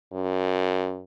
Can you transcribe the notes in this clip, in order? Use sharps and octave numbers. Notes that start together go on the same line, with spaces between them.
F#2